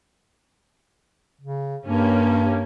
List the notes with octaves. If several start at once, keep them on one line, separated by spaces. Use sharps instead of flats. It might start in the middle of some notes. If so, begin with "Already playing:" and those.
C#3
G2 A#3 C#4 G4